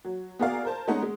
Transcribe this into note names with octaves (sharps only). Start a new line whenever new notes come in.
F#3
B3 F#4 G#4 A#4 D5 F5
A#4 C5 A5
G#3 A3 B3 C#4 D#4 F#5
G#3